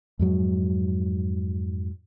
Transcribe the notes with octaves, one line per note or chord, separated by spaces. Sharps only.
F2 G#2 F#3